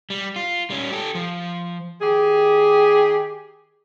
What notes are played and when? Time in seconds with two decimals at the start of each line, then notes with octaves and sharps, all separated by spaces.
0.10 G3
0.36 F4
0.70 G3 C#4
0.92 G4 A4
1.15 F3
2.02 D#3 G4 G#4